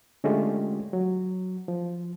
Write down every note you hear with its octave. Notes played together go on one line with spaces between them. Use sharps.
D3 G#3 A3 C#4 F4 G4
F#3
F3